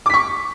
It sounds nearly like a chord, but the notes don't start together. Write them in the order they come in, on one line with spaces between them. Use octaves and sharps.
D6 B6 C#6